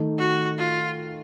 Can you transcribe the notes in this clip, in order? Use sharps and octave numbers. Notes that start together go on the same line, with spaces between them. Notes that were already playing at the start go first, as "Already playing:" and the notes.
Already playing: D#3 A3 D#4
F#4
F4